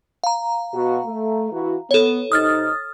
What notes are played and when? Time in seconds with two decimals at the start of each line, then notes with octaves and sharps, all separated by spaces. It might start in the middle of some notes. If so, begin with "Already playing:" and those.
0.24 F5 A#5
0.74 B2 F#4
1.06 A3
1.52 E3 E4 F#4
1.91 B3 A4 C#5
2.32 C3 D#4 D#6 F6 A6